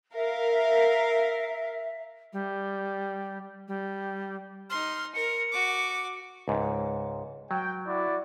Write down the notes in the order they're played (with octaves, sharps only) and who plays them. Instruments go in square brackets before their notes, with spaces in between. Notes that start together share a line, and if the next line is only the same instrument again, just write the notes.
[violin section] A#4 F5 [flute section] E5
[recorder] G3
G3
[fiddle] D#4 C6 [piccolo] F6
[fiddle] A#4 [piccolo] C#7
[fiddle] F#4 D6
[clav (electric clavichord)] C#2 G#2
[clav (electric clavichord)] F#3 [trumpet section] G5
[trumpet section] E4 F#4 D5